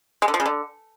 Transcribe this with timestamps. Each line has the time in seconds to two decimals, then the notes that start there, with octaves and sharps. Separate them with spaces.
0.22 G#3
0.28 D3
0.34 F3
0.40 C#3
0.46 D3